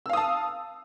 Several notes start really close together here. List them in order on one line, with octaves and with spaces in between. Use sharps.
E6 F5 D#6 A5